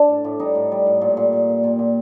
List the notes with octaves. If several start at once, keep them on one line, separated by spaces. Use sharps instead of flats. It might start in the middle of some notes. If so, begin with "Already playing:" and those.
Already playing: D4
A2
A2
G3 D#4
A2
G3
A2
A#2
A#2
A#2
A#2
A#2
A#2